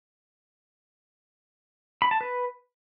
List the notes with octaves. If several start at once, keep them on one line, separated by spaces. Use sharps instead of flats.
B5
A5
B4